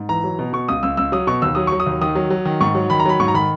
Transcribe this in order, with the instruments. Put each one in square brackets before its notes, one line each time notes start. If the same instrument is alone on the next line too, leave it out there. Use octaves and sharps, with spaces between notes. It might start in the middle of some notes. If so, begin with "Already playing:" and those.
Already playing: [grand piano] G#2
E3 A#5
F#3
B2
B2 C#6
C#2 D#6
C#2 E6
C#2 E6
F#3 D#6
B2 C#6
D#2 E6
F#3 D#6
F#3 C#6
D#6
D#2
D#3 D#6
F#3
F#3
D#3
G#2 C#6
F#3
D#3 B5
A#5
F#3 B5
G#2 C#6
A#5
D#3 B5